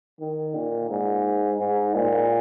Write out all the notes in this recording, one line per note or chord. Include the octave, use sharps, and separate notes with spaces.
D#3
A#2
G#2
G#2
A#2